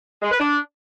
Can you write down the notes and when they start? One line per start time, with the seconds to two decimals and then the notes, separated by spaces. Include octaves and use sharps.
0.22 G#3
0.31 B4
0.40 D4